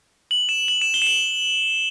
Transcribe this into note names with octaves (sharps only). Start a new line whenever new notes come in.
F#7
E7
F#7
E7
G7
E7
F#7